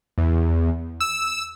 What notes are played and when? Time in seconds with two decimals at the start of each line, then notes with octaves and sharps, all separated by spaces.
0.18 E2
1.00 E6